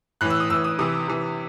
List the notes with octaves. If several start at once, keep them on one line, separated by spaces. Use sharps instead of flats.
A2 E3 F#6
E6
D#6
A2 E3 E6
D#6
C3 E3 D#6
C3 E3